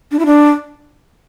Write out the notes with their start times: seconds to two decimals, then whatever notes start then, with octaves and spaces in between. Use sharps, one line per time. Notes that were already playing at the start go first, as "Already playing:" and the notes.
0.12 D4
0.19 E4
0.26 D4